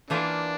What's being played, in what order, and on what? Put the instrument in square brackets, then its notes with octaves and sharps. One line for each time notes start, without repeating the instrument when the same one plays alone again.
[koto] E3 A#3 F4 [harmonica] A3 D4